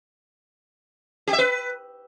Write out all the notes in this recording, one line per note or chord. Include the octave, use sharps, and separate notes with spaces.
G4
E5
B4